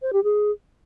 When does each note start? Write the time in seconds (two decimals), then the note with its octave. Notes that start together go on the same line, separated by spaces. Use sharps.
0.02 C5
0.13 G4
0.24 G#4